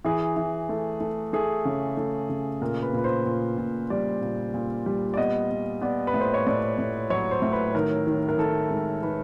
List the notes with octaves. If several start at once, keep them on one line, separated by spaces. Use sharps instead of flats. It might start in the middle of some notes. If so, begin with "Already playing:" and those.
E3 G#4
E3
A3
A3
A3 G#4
C#3
A3
C#3
A#2 A#4
B4
A#2 B4
C5
A#2
A#2
G3 D5
A#2
A#2
G3
D5
B3 D#5
B3
B3 D5
B4
A2
C5
C#5
A2 D5
A2
F#3 C#5
C5
A2
B4
D#3 A#4
D#3
A#4
D#3 A4
G#3
D#3 B4